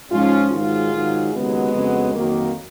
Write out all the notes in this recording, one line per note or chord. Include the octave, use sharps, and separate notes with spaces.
G#2 F3 C#4 F4
G#2 D#3 F#3 F4 G#4
G#2 D#3 F#3
D#2 C#3 F#3 G#3 B3
F2 C#3 F#3
F2 D#3 F#3 A#3